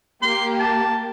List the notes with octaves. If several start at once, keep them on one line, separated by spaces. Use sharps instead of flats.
A#3 G4 C6
A5